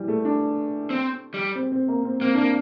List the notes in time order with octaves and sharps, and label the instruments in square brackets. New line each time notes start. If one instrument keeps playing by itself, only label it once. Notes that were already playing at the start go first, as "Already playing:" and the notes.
Already playing: [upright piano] E3 G3
A3
D4
[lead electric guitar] C4
G3
[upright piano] C4
C4
A#3
C4
[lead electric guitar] A#3 [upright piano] C4
[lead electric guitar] A#3 [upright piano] D4